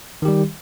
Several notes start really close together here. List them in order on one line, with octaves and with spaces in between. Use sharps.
D#3 G4 G3